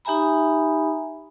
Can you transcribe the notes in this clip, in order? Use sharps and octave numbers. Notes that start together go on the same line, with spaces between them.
D#4 G4 E5 G#5 A#5 B5